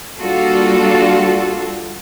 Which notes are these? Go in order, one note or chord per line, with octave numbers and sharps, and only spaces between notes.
G3 A#3 D4 F4 F#4 A4